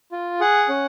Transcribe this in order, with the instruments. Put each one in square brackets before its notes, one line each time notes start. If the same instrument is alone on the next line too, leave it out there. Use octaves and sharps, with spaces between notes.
[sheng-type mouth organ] F4
G#4 F#5
C#4